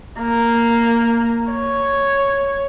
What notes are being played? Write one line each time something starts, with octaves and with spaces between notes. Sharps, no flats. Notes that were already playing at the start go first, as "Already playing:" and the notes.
A#3
C#5